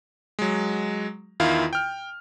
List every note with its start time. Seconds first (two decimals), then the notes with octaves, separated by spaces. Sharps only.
0.39 F#3 G#3
1.40 E2 D#3 E4 F4 F5
1.73 G5 F6